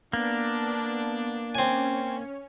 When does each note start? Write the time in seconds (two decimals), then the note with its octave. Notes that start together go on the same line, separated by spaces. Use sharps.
0.13 A#3 B3 D4
1.55 C4 C#4 C#5 G#5